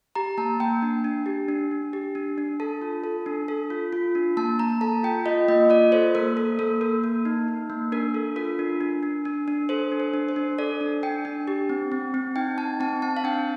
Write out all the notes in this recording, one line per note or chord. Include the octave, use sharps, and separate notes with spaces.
G4 A#5
A#3 A5
A#3 G5
D4
D4
G4
D4
D4
G4
D4
D4
A4 A5
F4
A4
D4
A4
F4
F4
D4
A#3 A5
A#3 A#5
A4 A5
F4 G5
F4 D#5
A#3 D#5
F4 D5
A4 C5
A#3 A#4
A4
A#3 A4
A#3 A#4
A#3
D#4
D#4
A#3
D4 A#4
A4
F4 A#4
D4
D4
D4
D4
D4
A4 C5
D4
C5
D4
C5
D4
A4 D5
D4
D4 G5
D4
G4
C4
C4
C4
D#4 G5
D#4 A5
C4 A5
C4 A5
F5
D4 G5